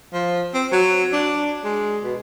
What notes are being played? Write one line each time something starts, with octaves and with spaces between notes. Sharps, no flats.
F3
C4
F#3
D4
G#3
B2